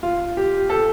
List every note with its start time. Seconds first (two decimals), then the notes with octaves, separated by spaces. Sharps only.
0.03 F4
0.37 G4
0.70 A4